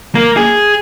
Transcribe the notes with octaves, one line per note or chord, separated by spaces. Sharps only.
A#3
G#4